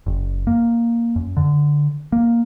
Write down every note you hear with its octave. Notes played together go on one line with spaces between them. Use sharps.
F#1
A#3
F#2
D3
A#3